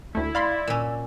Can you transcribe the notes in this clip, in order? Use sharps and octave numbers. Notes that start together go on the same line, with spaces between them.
D2 A3 E4
D5 F5 B5 C6
A#2 C#4 E6